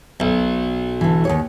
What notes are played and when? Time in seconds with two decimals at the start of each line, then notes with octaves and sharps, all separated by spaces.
0.20 B1
1.01 D3 E3
1.25 D#2 C3 C#5